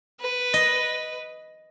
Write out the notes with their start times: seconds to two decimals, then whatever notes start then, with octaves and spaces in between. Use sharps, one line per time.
0.21 B4
0.54 D#5